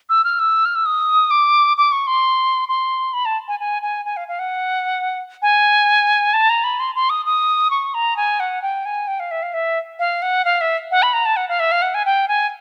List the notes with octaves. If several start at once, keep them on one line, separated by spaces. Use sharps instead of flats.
E6
F6
E6
F6
E6
D#6
D6
D6
C#6
C6
C6
B5
A5
G#5
G#5
G#5
G#5
F5
F5
F#5
G#5
A5
A#5
B5
C6
C6
D#6
D#6
C#6
A#5
G#5
F#5
G5
G#5
G5
F5
E5
F5
E5
F5
F#5
F5
E5
F#5
B5
A#5
A5
F#5
F5
E5
F5
F#5
G#5
G5
G#5